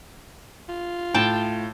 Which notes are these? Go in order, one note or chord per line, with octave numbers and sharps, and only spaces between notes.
F4
A2 G5 A5